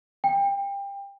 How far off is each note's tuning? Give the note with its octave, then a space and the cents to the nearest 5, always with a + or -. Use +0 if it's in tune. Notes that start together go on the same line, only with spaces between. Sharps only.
G5 +25